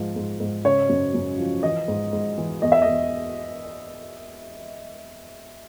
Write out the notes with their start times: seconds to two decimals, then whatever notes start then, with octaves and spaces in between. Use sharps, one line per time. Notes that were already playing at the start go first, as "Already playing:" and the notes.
Already playing: G#2 F3
0.16 G#2
0.40 G#2
0.64 C#3 C#5
0.89 F#2
1.14 F#2
1.38 F3
1.63 E3 D#5
1.88 G#2
2.13 G#2
2.38 E3
2.62 E2 D#5
2.72 E5
2.82 D#5
2.86 E2